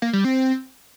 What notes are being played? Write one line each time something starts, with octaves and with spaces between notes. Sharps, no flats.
A#3
G3
C4